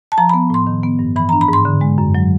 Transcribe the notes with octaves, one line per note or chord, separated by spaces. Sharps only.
A5
F3 A#5
B5
B3
A2 C6
D#3
B3
G2
E3 B5
A#5
D4
B5
G#2 C6
D3
G#3
F#2
F#3